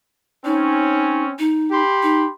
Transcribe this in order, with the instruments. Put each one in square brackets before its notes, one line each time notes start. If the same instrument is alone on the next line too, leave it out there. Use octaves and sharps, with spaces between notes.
[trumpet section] C4 C#4 [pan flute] D#4
[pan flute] D#4
[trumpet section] G4 B5 C6
[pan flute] D#4